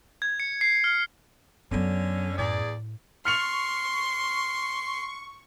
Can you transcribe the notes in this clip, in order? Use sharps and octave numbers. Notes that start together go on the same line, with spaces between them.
G#6
C#7
C7
F6
F#2 D3 F#3 B3 C#4
E2 A2 G#4 D5
C6 C#6 F6 C#7 F7